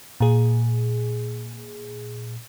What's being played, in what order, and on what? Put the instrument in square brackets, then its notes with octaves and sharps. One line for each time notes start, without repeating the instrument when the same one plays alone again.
[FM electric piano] A#2 G#4